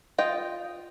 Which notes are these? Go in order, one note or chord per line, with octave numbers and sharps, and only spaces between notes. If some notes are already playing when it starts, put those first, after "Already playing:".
F4 D#5 G5